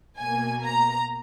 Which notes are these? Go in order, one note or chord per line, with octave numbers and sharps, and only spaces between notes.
B2 A#3 G#5
A#5